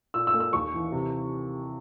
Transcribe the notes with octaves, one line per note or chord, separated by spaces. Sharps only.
A#2 E6
E6
A#3
E6
D#2 C#6
E3
C3